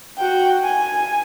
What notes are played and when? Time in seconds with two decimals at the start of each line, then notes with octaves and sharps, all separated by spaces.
0.18 F#4 G5
0.64 G#5